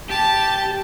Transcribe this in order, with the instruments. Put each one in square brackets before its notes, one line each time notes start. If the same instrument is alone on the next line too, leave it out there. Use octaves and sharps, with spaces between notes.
[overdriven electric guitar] G4 [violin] A5